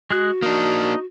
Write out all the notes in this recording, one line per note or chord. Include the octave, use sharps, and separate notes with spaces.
G#3 F#4 G#4 F#6
A#3 D4 D#4